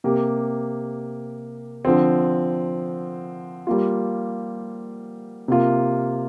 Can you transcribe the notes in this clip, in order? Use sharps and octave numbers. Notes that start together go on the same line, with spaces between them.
C3 A#3 G4
D3 F3 C4
G3 A#3 F4
C3 A#3 F4